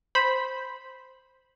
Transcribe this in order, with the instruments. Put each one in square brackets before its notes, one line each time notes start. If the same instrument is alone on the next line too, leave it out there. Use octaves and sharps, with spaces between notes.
[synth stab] C5 B5